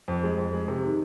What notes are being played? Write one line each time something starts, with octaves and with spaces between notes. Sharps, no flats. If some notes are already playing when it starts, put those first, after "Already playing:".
F2
G#3
F2
G#3
C3
D#3